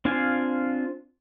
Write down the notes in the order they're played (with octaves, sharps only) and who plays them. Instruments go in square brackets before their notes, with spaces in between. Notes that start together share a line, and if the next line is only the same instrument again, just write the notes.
[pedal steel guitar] C4 D4 F4 F5 G#5